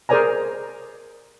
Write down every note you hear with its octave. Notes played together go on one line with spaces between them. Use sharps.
G#4 A#4 C5 D5 G#5 A#5